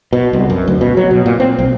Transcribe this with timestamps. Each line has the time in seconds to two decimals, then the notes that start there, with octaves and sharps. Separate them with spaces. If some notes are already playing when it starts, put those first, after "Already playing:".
0.13 B2
0.33 C2
0.50 F#2
0.67 D2
0.81 B2
0.97 F#3
1.11 B2
1.26 A#2
1.40 C4
1.59 B1